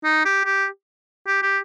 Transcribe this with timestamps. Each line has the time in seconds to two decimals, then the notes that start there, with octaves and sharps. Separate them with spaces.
0.04 D#4
0.25 G4
0.45 G4
1.27 G4
1.42 G4